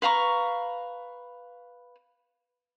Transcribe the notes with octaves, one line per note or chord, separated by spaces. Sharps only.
B4 F5 A#5 C#6